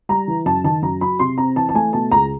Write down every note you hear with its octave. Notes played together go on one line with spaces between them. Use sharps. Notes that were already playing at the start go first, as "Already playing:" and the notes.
G3 A#5
E3
F#2 A5
D#3 A5
F#2 A#5
F#3 B5
C3 C6
C4 A#5
E3 A5
A5
A3 G#5
B2 A5
C#2 A#5